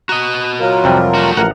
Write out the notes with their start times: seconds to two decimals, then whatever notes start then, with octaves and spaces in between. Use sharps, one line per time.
0.09 F#4 D#5 A#5
0.60 F#3 F4 A#4
0.84 F2 C3 G3
1.15 A3 F#4
1.37 A1 F3 A#4 F#5 A#5